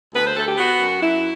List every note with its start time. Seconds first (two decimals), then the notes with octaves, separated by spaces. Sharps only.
0.14 D2 B4
0.25 C5
0.36 D2 A4
0.46 G4
0.58 B3 F#4
0.80 F#2
1.01 F#2 E4